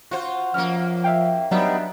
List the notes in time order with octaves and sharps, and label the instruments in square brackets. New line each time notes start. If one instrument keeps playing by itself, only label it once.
[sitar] F4 F#4 C5
[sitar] F#2 A#3 [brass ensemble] F3 [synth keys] F6
[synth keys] E5 F5 G5
[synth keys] F#3 [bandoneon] G3 B3 D#4 [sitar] D4 E5